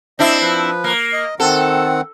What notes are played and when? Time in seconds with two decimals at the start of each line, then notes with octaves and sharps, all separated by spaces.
0.19 C4 D4 E4 D#5
0.41 F3 B4
0.84 A#3
1.13 D#5
1.40 D#3 C4 A4 F#5